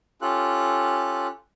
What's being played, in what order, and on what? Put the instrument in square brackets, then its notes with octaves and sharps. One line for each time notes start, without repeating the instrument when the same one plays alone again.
[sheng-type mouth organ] C#4 F4 G4 A4 F#6